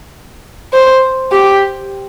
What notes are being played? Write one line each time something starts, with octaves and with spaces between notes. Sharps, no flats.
C5
G4